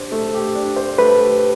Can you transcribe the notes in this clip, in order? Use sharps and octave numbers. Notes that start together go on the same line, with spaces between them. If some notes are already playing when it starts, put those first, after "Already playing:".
Already playing: D4 G4 C5
A3
G4
D4
C5
A3 B4
G4